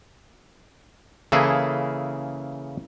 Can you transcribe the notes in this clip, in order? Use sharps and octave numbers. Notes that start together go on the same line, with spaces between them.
C#3 E3 A#3 E4 G#4 A4